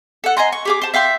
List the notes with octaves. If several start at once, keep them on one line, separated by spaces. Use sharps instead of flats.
A4 F#5
D#5 G#5 A#5 C6
C#6
G4 G#4 D6
C5 A5
E5 F5 G5 C6